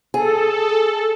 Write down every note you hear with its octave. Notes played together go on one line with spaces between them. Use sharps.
G#4 A4